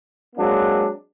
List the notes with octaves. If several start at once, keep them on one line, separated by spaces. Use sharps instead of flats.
F#3 G#3 A#3 C4 D4